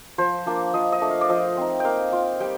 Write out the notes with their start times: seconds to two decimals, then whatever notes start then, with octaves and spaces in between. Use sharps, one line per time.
0.18 F3 C5
0.46 A#3 D4 F4
0.74 F3 D#5
0.92 D#5
1.01 A3 D4
1.11 F5
1.21 D5
1.29 F3 D#5
1.57 C4 D#4
1.80 A#3 F5 G5
2.13 F4
2.40 G3 G5